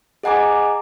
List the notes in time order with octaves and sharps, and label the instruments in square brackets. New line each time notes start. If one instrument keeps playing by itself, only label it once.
[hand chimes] G#4 D#5 F#5 G#5 A#5 D6